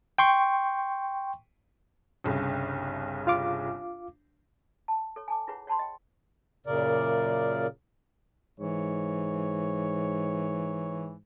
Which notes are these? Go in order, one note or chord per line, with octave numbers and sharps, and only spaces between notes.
G5 C6 C#6
G1 C2 C#3
F4 F5 D6
A5
A4 C#5
G#5 A5 D6
E4 F4 G#4 B4 C#5 F#5
C#5 F#5 A5 B5 C6
D#5 G5
F#2 A#2 C#3 A#4 D5
G#2 E3 C#5